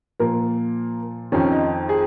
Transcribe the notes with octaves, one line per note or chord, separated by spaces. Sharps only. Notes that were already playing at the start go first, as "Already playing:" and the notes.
A#2 F3 A#3
F2 D#3 C#4
D#4
G#4